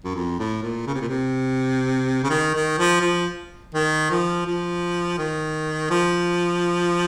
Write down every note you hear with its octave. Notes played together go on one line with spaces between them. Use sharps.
F#2
F2
A2
A#2
C#3
C3
A#2
C3
C#3
D#3
D#3
F3
F3
D#3
F3
F3
D#3
F3